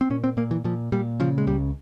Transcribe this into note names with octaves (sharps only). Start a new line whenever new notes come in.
C4
A#2 C#4
C4
A#2 A#3
E3
A#2 F3
A#2 G3
C#3 F3
G#3
C#2 G3